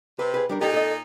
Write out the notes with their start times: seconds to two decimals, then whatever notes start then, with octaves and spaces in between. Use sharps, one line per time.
0.19 C3 B4
0.34 G#4 B4
0.49 G3 D4 A#4
0.61 A#2 D#4 G4 A4
0.74 A4 D#5